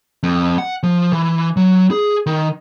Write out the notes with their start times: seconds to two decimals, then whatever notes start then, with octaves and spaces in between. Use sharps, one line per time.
0.23 F2
0.58 F#5
0.83 F3
1.13 E3
1.57 F#3
1.91 G#4
2.26 D#3